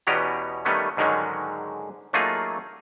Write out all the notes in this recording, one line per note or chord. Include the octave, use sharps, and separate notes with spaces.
E2 B2 B3 C#4 G4 A#5
D#3 G3 A3 B3 C#4
G#2 D3 D#3 F#3 G#3 C#4
F#3 A3 A#3 D#4 F4 G#4